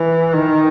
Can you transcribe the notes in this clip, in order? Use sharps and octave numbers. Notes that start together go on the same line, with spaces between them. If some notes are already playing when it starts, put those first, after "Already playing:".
Already playing: E3
D#3